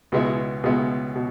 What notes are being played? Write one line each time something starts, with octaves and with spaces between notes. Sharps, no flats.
C#2 B2 G#3 B3 E4
C#2 B2 G#3 B3 E4
B2